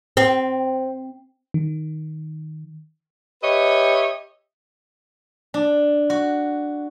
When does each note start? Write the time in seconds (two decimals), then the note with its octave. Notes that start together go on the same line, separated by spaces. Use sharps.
0.17 C4
1.54 D#3
3.43 G4 B4 C#5 D#5 E5
5.54 D4
6.10 F#4